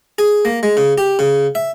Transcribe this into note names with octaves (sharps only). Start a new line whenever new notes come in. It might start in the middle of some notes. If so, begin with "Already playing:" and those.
G#4
A#3
G#3
C#3
G4
C#3
E5